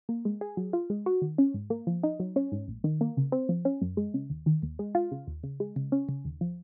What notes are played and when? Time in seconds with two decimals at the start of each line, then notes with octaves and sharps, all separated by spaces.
0.09 A#3
0.25 G#3
0.41 G#4
0.57 F#3
0.73 F4
0.90 G#3
1.06 F#4
1.22 D#3
1.38 C#4
1.54 G#2
1.70 A#3
1.87 F3
2.03 D#4
2.20 F#3
2.36 C#4
2.52 G#2
2.68 A#1
2.84 D#3
3.01 A#3
3.17 C#3
3.32 C4
3.49 F3
3.65 C#4
3.82 F#2
3.97 G#3
4.14 C#3
4.30 D#2
4.46 D#3
4.63 D#2
4.79 G#3
4.95 F4
5.12 C#3
5.27 D#2
5.44 C#3
5.60 G#3
5.76 C#3
5.92 C#4
6.09 C#3
6.25 D#2
6.41 F3